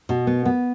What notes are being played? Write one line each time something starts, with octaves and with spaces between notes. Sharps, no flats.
B2
B3
B3